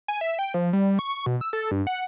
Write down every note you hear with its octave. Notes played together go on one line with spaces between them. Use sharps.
G#5
E5
G5
F3
G3
C#6
B2
E6
A4
G2
F#5